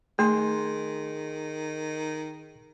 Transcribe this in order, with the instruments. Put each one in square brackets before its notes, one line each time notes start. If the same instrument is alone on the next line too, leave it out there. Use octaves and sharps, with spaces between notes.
[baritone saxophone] D#3 [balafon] A3 [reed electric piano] G#4 C6